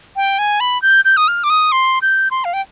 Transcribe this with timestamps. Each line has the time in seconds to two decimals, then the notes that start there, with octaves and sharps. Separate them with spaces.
0.16 G5
0.39 G#5
0.60 B5
0.82 G6
1.05 G6
1.17 D#6
1.28 F6
1.44 D6
1.50 D#6
1.72 C6
2.02 G6
2.31 C6
2.45 F5
2.53 G5